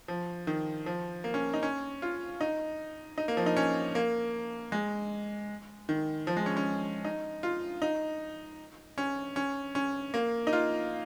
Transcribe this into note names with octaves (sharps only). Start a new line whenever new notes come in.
F3
D#3
F3
A#3
C#4
D#4
C#4
F4
D#4
D#4
A#3
F3
D#4
C#4
A#3
G#3
D#3
F3
G#3
C#4
C#4
D#4
F4
D#4
C#4
C#4
C#4
A#3
D#4
F4